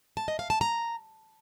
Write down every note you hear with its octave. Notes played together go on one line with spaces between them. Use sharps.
A5
D#5
F5
A5
A#5